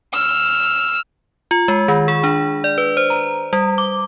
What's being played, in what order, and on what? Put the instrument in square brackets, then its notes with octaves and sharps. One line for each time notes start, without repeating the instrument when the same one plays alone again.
[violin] E6 F6
[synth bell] F4
G#3
D#3
G#4
D4
D5
B4
C5
A#5
G3
D6